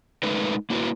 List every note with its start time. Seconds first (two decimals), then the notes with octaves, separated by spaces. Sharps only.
0.23 G#3 A3 D#4 A#4 B4
0.70 A#3 E4 F#4 B4